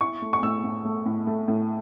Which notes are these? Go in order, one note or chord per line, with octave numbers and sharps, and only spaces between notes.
E4 C#6
A3
C#6
A2 E6
A2
A3
A2
A3
A2